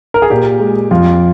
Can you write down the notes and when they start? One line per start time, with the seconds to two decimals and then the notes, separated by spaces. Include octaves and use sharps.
0.14 A#4
0.22 G#4
0.30 A#2 G4
0.60 G#3
0.91 F2 F4